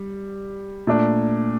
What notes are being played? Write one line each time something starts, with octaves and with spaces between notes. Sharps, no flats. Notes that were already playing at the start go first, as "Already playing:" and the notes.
Already playing: G3
A#2 A3 D4